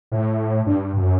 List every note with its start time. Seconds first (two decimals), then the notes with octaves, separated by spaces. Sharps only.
0.12 A2
0.66 G2
0.97 F#2